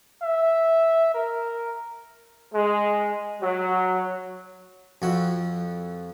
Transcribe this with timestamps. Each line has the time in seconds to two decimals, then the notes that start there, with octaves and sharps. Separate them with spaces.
0.22 E5
1.14 A#4
2.54 G#3
3.41 F#3
5.02 F2 F#4